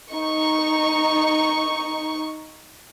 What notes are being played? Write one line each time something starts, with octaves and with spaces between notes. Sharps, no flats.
D#4 C#6